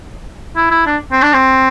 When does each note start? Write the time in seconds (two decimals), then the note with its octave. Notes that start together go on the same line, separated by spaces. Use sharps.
0.56 E4
0.71 E4
0.86 D4
1.12 C4
1.23 D4
1.33 C4